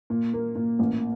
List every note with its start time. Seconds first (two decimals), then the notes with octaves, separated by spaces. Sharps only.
0.10 A#2
0.33 A#3
0.55 A#2
0.79 A1